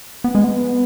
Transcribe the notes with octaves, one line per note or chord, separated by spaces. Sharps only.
B3
G#3
B3